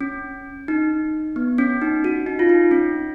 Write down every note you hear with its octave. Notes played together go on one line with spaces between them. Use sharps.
C#4
D#4
B3
C#4
D#4
F#4
D#4
F4
D#4
C#4